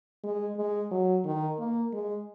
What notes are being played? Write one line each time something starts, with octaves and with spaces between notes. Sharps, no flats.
G#3
G#3
F#3
D#3
A#3
G#3